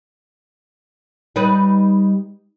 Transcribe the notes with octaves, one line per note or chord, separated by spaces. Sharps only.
G3 D#4 B4